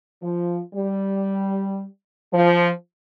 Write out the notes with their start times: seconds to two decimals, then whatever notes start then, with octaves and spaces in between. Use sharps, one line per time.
0.22 F3
0.74 G3
2.33 F3